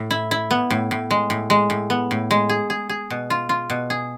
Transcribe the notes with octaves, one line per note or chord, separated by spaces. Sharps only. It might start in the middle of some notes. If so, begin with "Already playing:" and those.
Already playing: A2
E4
E4
B3
A2
A2
G#3
A2
G#3
A2
B3
A2
G#3
G#4
G#4
G#4
B2
F4
F4
B2
G#4